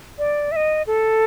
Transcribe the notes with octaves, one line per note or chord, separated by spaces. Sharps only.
D5
E5
D#5
A4